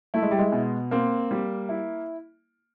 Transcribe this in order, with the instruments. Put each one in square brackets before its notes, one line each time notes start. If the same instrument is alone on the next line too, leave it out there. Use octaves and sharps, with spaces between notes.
[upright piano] A3 [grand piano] E4
[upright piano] G#3
G3
G#3
[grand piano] B2
[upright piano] A#3 [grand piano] C4
[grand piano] G3
E4